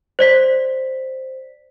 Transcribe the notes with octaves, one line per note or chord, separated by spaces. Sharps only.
C5 D5 B6